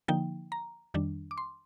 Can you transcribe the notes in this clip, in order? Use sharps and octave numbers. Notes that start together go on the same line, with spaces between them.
D3 F3 A#3 D#4 G5
A#5
F2 D#3 G3 D4
D6
C6